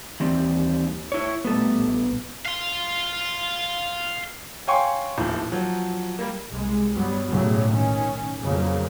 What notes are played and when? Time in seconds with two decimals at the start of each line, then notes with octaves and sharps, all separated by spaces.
0.20 D#2 E3 G3 C4
1.12 E4 C#5
1.45 A#2 G3 A3 B3 A4
1.77 A#1
2.46 F5 C6
4.67 C#5 F5 G5 G#5 C6 C#6
5.18 D#1 A2 F3
5.52 F3 F#3
6.19 G3 A#3
6.50 C2 G#3
6.94 G2 F#3 G3 B3
7.30 B1 F#2 A2 C#3 F#3 G3
7.70 D#3 C#4
8.41 F2 C#3 F3 F#3 A#3